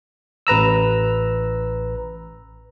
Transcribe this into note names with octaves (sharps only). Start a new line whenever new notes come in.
A1 B4 A#5 E6